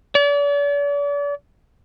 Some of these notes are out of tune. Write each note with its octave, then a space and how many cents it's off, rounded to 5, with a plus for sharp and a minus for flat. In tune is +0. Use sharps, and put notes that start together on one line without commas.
D5 -40